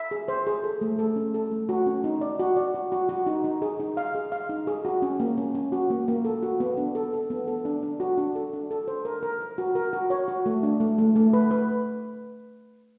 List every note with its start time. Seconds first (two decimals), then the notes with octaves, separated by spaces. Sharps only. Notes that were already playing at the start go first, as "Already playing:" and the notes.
Already playing: E5
0.11 G#4
0.28 C5
0.47 G#4
0.64 A4
0.81 A3
0.99 A4
1.16 C#4
1.34 A4
1.52 A3
1.69 F#4
1.87 C#4
2.04 D#4
2.21 D5
2.39 F#4
2.57 D5
2.75 F#4
2.92 F#4
3.09 F#4
3.27 D#4
3.44 D#4
3.62 G#4
3.80 D#4
3.97 F5
4.15 G#4
4.32 F5
4.49 D#4
4.67 G#4
4.85 F#4
5.02 C#4
5.20 A#3
5.38 C#4
5.55 C#4
5.72 F#4
5.90 A#3
6.08 A#3
6.25 A4
6.43 F#4
6.60 B3
6.77 D4
6.95 A4
7.13 A4
7.30 B3
7.48 A4
7.65 D4
7.83 D4
8.00 F#4
8.18 D4
8.35 A4
8.53 D4
8.71 A4
8.88 C5
9.05 A#4
9.23 A#4
9.41 A#4
9.58 F#4
9.75 A#4
9.93 F#4
10.10 C#5
10.28 F#4
10.46 A3
10.63 D4
10.80 A3
10.98 A3
11.16 A3
11.33 B4
11.51 B4